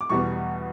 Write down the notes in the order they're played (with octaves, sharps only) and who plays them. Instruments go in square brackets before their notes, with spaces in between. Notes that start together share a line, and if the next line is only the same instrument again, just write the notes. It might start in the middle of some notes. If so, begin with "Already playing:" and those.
[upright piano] D6
E2 B2 G3 B3 C#6